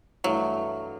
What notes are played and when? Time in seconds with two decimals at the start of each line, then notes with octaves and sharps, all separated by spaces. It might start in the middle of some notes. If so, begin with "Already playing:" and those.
0.24 G2 E3 F#3 A3 E4